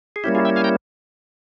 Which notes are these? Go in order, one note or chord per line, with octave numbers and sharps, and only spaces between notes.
G#4
G3 A#3 C#4 E4 G4
F4 G#4
E5 G5
F5 G#5
G5 A#5